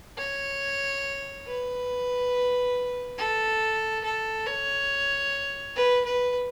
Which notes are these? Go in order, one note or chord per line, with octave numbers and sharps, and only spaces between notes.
C#5
B4
A4
A4
C#5
B4
B4